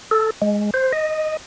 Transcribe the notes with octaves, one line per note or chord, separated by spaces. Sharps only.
A4
G#3
C5
D#5